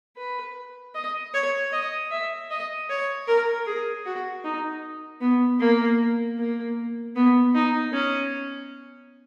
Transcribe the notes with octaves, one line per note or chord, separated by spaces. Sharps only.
B4
D#5
C#5
D#5
E5
D#5
C#5
A#4
G#4
F#4
D#4
B3
A#3
A#3
B3
D#4
C#4